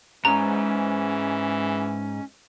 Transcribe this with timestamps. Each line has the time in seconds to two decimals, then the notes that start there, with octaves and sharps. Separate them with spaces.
0.25 G#2 E3 C#4 A#5